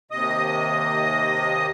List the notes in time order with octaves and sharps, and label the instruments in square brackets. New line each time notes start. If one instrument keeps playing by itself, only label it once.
[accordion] D#2 C3 D#5 D#6